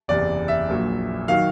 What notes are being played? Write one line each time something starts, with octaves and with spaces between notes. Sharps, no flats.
F#1 E2 C3 D5
E5
A#1 A#2 F#3
D#3 F#3 F5